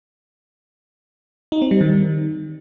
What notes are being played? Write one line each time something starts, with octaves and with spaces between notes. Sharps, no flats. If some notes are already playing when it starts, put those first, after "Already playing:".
D#4
C4
G3
D#3